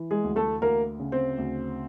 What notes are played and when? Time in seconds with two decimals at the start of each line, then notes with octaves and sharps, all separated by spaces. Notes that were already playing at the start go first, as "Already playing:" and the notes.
Already playing: E3
0.11 G#3 G#4
0.24 D2
0.36 A3 A4
0.61 D2 A#3 A#4
1.00 C#3
1.12 C4 C5
1.38 D2